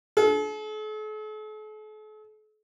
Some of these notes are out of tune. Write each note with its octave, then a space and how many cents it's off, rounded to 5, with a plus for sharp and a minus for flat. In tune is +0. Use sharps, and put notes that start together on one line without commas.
A4 -45